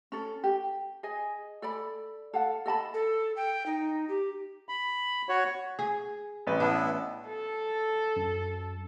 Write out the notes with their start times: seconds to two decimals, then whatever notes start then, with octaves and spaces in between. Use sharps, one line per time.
0.12 C#4 A4
0.44 G4
1.03 G#4 D#5 G#5
1.62 A4 D5 B5
2.33 A4 F5 F#5
2.66 A4 D#5 A5 B5
2.94 A4
3.36 G5
3.66 D#4
4.09 G4
4.69 B5
5.29 F#4 C#5
5.79 G#4
6.47 A1 B4
6.60 B3 D4 E4
7.28 A4
8.16 F#2